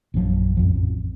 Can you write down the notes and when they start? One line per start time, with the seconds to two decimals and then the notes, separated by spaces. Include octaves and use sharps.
0.14 A#1 F#2 F3 F#3
0.57 A1 F2 F3